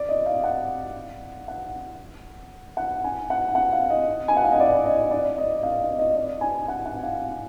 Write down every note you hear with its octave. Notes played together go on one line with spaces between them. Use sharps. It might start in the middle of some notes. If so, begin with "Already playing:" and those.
Already playing: D5
D#5
F5
F#5
F#5
F#5
G#5
F#5
F#5
F5
D#5
G#5
F#5
F5
D#5
D5
D#5
D5
D#5
F5
D#5
D#5
D5
G#5
F#5
F#5
F5